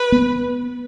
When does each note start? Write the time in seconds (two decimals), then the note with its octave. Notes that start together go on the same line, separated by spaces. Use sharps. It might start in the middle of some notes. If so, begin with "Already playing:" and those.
Already playing: B4
0.12 B3